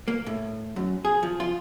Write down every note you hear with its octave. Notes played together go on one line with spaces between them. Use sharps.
A#3
A2
F#2
G#4
F3
F4